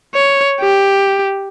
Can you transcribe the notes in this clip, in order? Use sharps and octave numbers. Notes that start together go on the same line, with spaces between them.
C#5
G4